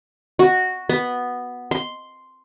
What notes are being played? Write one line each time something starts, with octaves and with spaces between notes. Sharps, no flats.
F#4
B3
C6